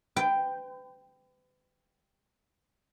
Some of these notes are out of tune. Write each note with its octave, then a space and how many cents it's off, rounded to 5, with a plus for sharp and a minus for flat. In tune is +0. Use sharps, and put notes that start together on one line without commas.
B4 +40 G5 +0